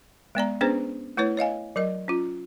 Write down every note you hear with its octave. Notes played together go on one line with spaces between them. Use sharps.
G#3 B3 D5 A#5
B3 C#4 D4 G#4 B4 C5
A3 E4 B4 C#5
C#5 D#5 F5 G#5
F#3 A#4 D#5
C#4 F4